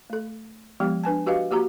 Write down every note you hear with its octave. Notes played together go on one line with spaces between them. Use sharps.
A3 A4
F3 G#3 B3 G4
D4 B4 G#5 A5
F#4 G4 B4 D#5 F5
A#3 F#4 G4 A#5